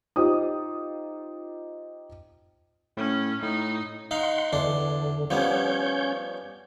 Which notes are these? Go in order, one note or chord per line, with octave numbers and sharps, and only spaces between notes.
D#4 F4 G4 C5 D#6
A2 C#4
A2 D#4
D#4 F5 F#5 C6
E2 D3 D4 C6
F3 G3 B3 C#4 C#5 G6